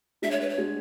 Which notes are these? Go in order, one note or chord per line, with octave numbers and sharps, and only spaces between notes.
G#3 D4 F#4 E5
C#5
B4
C#5
G#3 D4 F#4